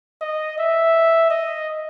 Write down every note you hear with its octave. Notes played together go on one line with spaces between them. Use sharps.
D#5
E5
D#5